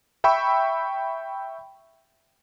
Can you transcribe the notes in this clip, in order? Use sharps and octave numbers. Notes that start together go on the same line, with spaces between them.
E5 G5 B5 C#6 E6